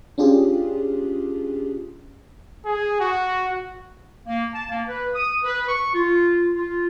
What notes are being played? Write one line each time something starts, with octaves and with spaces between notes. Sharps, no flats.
C#4 D4 F4 G4 G#4
G#4
F#4
A#3
A5
A#3
B4
D#6
B4
C#6
F4
F4